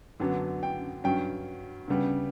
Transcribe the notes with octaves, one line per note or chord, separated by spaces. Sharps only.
F#2 D3 F#3 B3 D4
G5
G2 F#3 C#4 G5
D2 C#3 G3 B3